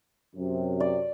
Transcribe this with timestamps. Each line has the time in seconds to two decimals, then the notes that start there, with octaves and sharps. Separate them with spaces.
0.35 F#2 C3
0.80 D5